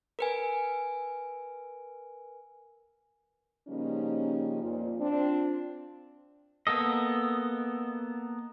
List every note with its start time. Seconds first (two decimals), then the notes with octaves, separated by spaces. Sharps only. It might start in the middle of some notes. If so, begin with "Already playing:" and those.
0.19 A#4 B4 G#5
3.68 C#3 F3 G3 A#3 C#4 D#4
4.62 F2 A#2 F3
4.98 C4 D4 F4
6.67 A#3 B3 A4 D#5